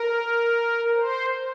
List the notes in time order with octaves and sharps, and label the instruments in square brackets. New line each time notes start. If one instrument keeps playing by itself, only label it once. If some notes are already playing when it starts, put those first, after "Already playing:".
Already playing: [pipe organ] A#4
C5